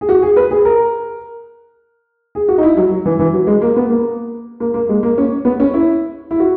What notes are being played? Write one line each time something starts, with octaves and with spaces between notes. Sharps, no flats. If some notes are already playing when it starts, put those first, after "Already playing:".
G#4
F#4
G#4
B4
G#4
A#4
G#4
F#4
D#4
E4
F#3
F#3
E3
E3
F#3
G#3
A#3
B3
A#3
A#3
A#3
G#3
A#3
C#4
B3
C#4
E4
E4
F#4